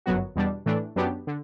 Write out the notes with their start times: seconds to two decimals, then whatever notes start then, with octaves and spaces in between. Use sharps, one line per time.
0.06 G1 F#2 F#3 B3 F#4
0.36 E2 B2 G3 D4
0.66 A2 E3 A3 D4
0.96 F#2 F#3 B3 D4 G4
1.27 D3